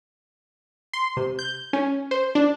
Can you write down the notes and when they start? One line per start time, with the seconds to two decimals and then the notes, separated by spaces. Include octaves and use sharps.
0.93 C6
1.17 C3
1.39 G6
1.73 C#4
2.11 C5
2.35 D4